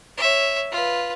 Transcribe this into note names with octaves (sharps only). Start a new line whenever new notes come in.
C#5 E5
F4 B4